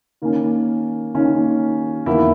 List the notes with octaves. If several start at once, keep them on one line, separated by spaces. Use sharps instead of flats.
D#3 A#3 C#4
D#3 A#3 C#4
E2 D#3 A#3 E4